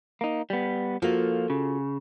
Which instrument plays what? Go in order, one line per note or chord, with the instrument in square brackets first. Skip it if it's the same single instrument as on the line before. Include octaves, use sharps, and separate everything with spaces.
[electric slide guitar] A#3 D#4
G3 B3
[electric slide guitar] F3 A#3 [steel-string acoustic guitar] F4 F#4 A4
[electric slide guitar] C#3